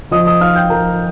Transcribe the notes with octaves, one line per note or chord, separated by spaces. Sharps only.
F3 D#5 D#6
D#5 D#6
D#4 F5 F6
G5 G6
F3 A#4 A#5